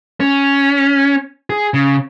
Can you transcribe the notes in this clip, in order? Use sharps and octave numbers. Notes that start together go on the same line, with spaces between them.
C#4
G#4
C#3